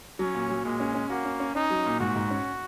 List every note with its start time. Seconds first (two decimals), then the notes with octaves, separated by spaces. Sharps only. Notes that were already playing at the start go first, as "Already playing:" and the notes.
0.19 F#3 C#4
0.35 A#2
0.49 F#3
0.65 A#2 G#3
0.80 C#4
0.95 C#4
1.09 A#3 F#4
1.25 C#4
1.40 C#4
1.55 C#4 D#4
1.70 F#3
1.86 A#2
2.00 G#2 F#4
2.16 G#2
2.31 C#4